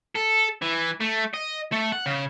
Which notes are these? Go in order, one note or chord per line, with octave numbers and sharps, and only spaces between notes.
A4
E3
A3
D#5
A3
F#5
C#3